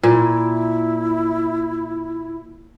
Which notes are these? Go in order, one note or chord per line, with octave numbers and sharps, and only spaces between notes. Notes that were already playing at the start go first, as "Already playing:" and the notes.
A#2 E4